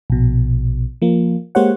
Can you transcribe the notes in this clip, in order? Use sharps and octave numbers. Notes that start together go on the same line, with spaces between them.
A#1 B2
F3 A#3
G#3 A#3 G4 C5 C#5 F#5